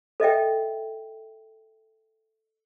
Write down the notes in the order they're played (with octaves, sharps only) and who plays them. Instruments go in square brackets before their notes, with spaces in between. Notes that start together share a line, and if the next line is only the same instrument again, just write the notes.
[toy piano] A4 D#5 E5 G5